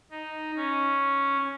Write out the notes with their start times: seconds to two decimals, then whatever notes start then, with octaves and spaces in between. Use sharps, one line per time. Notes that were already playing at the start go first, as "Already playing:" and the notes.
0.11 D#4
0.56 C#4